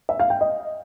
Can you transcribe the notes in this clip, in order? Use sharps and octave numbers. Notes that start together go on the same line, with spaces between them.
E5
F5
G5
D#5